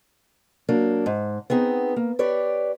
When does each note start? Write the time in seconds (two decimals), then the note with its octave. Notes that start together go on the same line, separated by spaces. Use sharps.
0.69 F#3 A#3 D4
1.06 G#2
1.50 B3 C4 D#4 G#4
1.96 A#3
2.19 G4 B4 C#5 D5